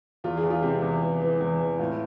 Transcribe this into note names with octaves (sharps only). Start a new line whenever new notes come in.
E2 F4
G#4
E2
F4
C3 G4
E2
E3
E3
E2
E3
A2 F4